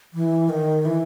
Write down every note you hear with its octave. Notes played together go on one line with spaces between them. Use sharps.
E3
D#3
E3